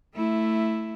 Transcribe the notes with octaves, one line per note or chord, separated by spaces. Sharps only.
A3 E4